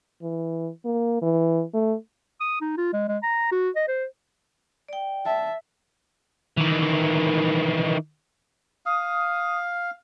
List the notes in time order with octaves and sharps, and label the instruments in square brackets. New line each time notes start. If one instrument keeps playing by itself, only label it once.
[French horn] E3
A#3
E3
A3
[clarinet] D#6
D#4
F4
G#3
G#3
A#5
F#4
D#5
C5
[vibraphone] D5 G5
[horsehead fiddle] E5 [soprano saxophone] A5
[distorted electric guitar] D#3 E3
[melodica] F5 [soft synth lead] D#6